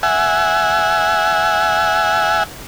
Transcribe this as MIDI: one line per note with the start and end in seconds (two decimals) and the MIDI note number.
0.03 2.43 76
0.03 2.43 78
0.03 2.43 80